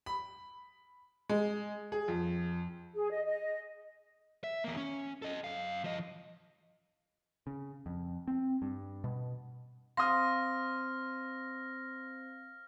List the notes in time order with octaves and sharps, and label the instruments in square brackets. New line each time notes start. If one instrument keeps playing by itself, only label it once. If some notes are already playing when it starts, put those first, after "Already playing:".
[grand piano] B5
G#3
G#4
F2
[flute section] G#4
D#5
D#5
[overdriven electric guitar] E5
E2 A#3
C#4
A4 D#5
F#2 F5
F3 D#5
[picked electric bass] C#3
F2
C4
G2
B2
[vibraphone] C4 C5 [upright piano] F5 D#6 [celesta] C6 [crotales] F6 A#6